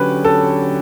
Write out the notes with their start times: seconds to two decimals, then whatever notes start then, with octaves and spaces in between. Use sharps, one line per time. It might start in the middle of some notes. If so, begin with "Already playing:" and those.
Already playing: D3 F#3 C#4 G4 B4
0.24 A4